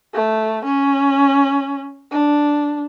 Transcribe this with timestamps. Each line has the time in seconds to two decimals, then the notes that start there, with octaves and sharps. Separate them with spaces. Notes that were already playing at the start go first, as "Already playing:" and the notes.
0.14 A3
0.65 C#4
2.12 D4